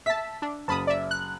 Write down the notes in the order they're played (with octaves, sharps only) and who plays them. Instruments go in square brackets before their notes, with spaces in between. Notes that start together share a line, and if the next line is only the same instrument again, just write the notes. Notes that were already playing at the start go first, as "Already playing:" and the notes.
[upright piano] E5 [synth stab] A5 B6
[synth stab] D4
[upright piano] F#1 [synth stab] A5 B5 D#6
[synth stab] D5 E5
F#6